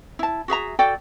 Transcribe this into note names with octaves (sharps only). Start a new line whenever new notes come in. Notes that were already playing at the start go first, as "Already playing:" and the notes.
E4 A5
F#4 G#4 E5 A#5
F#4 A4 D5 G5